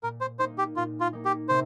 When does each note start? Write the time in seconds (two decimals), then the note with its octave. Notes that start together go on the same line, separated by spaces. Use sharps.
0.03 A#2 A#4
0.21 C5
0.39 A#3 D#4 C5
0.58 G4
0.76 A#2 F4
1.00 F4
1.13 A#3 D#4
1.25 G4
1.49 C3 C5